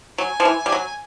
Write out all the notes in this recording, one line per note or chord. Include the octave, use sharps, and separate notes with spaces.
F#3 G#5
F3
E3
G3
F#3